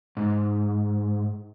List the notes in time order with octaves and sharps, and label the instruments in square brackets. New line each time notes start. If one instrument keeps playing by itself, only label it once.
[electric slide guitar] G#2